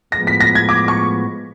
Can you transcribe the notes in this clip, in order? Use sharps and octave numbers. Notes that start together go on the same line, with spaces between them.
A2 F3 G#3 B3 A#6
B6
A#6
G#6
D6
C#6